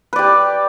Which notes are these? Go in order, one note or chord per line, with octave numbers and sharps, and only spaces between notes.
G4 B4 D5